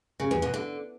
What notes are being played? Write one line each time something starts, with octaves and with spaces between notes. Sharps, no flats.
C#3
E2
B2
D3